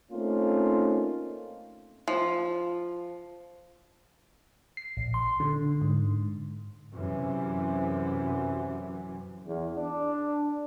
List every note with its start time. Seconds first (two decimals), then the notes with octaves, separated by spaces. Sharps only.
0.11 A3 A#3 C4 C#4 D#4 F4
2.08 F3
4.77 C7
4.97 A#1
5.14 C6
5.40 D3
5.82 G#2
6.94 F#2 C3 E3
9.47 E2
9.77 D4